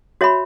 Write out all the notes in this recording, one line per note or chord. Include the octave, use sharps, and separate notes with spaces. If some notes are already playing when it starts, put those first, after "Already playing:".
F#4 C#5 E5 B5